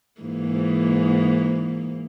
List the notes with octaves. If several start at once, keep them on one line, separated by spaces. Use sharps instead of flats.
G#2 E3 A#3